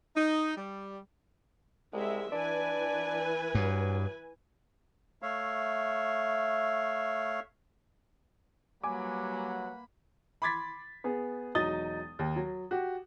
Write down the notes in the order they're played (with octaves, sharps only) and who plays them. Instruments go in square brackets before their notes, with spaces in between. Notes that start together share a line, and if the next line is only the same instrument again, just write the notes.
[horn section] D#4
G3
[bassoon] C2 [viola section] G#3 E5
[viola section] E3 B4 G#5 [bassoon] D4
[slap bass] G2 [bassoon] F#3
[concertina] A3 C#5 E5 F5
[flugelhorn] F#3 [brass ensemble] G3 B4 F#5 [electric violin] A#3 B5 [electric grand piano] G#5 D6
[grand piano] B5 C6 D6 G#6 A6 B6
B3 G#4
E1 F#3 D#4 D#6 A6 G7
D#2
F#3
F#4 G4